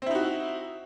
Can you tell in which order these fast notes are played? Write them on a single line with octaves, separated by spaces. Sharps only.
C4 E4 D#4 F#4